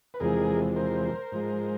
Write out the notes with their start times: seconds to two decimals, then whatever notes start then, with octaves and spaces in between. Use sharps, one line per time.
0.14 B4
0.20 E2 C3 F3 G#3 G#4 A#4
0.76 A#4 C5
1.32 G#2 F3 G#3